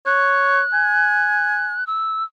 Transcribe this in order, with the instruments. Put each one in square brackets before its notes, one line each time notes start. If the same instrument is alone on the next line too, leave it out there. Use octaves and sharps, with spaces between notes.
[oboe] C#5 [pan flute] F#6
[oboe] G#5
[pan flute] E6